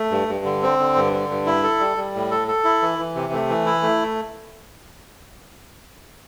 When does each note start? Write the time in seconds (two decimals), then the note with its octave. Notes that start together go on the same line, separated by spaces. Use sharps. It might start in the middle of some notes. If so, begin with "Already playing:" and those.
Already playing: A3
0.11 G2
0.28 G2
0.45 D3
0.62 C4
0.79 D3
0.96 G2
1.12 D3
1.29 G2
1.46 E4
1.63 A4
1.80 G3
1.97 G3
2.15 A2
2.31 A4
2.48 A4
2.64 E4
2.82 E3
2.99 E3
3.15 C3
3.33 A3
3.49 E3
3.66 E4
3.83 A3